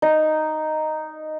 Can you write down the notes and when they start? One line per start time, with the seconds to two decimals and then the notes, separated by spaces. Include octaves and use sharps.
0.02 D#4